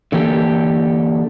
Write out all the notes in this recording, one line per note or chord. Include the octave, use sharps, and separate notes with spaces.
D3 E3 A#3 G4 A4